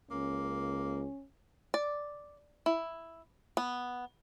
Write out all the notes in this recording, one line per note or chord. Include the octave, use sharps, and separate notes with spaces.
C#2 A#3 C#4
D5
E4
B3